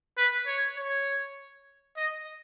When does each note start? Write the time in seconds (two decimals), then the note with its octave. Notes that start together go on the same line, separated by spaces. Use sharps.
0.17 B4
0.47 C#5
0.77 C#5
1.97 D#5